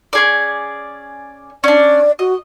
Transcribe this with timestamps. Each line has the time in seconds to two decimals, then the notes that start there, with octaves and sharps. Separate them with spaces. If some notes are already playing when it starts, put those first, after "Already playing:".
0.13 C#4 G#4 D5
1.64 C#4 D4 D5
2.19 F#4 D#5